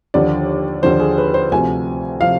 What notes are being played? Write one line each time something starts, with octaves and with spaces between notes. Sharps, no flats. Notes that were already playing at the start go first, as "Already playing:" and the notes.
D#2 D3 F3 D5
D#2 D3 F3 C5
G#4
B4
C5
D2 C3 F3 G#5
C3 F3 F5